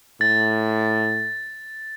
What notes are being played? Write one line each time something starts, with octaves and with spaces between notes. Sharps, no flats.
A2 A6